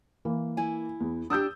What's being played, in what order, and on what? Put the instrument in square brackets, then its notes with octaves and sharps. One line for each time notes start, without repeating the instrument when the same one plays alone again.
[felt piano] E3 A#3
[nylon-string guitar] E4 G#5
[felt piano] E2
[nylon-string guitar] D4 G4 [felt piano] D#6 E6 G6